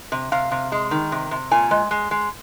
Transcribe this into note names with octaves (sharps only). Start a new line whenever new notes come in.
C3
C3 F5
C3
G#3
D#3
C3
C3
A#2 G#5
G#3
G#3
G#3